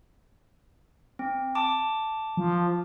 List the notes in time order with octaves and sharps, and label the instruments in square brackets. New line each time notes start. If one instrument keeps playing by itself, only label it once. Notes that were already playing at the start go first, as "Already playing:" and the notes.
[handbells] C4
A5 D6
[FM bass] F3